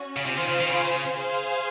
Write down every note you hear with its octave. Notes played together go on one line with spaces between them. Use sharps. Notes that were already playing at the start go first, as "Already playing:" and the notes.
Already playing: C#4 F#4
C#3
C3 F4 C5 F5 G#5
D#3
C#3
D#3
C#3
G#4 C5 F5